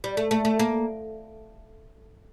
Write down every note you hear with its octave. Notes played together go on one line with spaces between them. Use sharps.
G3
A3
A3
A3
A#3